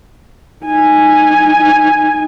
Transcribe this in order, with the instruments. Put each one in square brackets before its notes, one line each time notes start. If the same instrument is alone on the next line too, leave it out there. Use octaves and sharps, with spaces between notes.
[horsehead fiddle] D#4 G#5